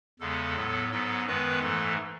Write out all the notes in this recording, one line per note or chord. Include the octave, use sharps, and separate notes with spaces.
E2 C#3 G#3 B3 A4
A2 F#3 B3
G#2 F#3 B3 A4
F#2 D#3 G#3 B3 B4
G#2 E3 A3 A4